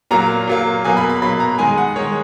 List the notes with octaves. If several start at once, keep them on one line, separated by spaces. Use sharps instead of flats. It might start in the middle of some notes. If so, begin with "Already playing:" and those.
A#2 F#3 A#3 A#5
A#2 F#3 A#3
B2 F#3 A#3 G#5
B5
B5
B2 F#3 A#3 B5
A#5
D#3 G#3 G#5
F#5
D#3 G#3 C#5